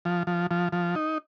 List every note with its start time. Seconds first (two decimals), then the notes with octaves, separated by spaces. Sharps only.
0.05 F3
0.27 F3
0.51 F3
0.73 F3
0.95 D#4